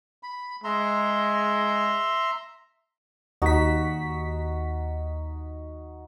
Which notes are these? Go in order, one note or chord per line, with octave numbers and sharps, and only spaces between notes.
B5
G#3 E5 A#5 C6
D#2 D#4 F#4 B6